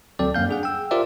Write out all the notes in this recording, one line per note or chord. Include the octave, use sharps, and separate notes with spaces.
D2 F#3 C4 A4 D5 G5
F#2 A#3 F5 G6
D4 G#4 F#5
G5 E6
F4 G4 A#4 C5 D5 E5